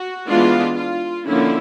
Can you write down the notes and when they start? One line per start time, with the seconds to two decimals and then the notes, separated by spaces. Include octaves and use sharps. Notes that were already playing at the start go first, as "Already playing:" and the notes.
Already playing: F#4
0.27 E3 G#3 B3 D4 F4
0.76 F4
1.26 D3 F3 A#3 C#4 E4